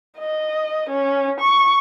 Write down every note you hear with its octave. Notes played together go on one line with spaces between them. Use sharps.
D#5
C#4
C#6